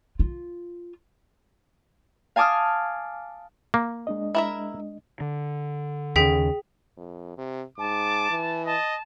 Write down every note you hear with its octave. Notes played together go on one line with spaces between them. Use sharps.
F4
F5 G#5 A5 D6 D#6 F6
A#3
G#3 D4 D#5
E4 A#4 E5
D3
D#2 C#3 G#4 G5 B6
F2
C3
G#2 A5 D6
E3
D#5 A5